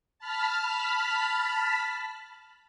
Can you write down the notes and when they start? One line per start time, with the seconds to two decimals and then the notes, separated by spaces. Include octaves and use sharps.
0.19 A5 B5 F6 B6